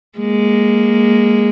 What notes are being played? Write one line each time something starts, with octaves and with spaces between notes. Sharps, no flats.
G#3 A#3